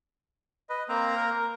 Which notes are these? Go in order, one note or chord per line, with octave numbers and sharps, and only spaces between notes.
B4 D#5
A#3 C4 A#5
A#4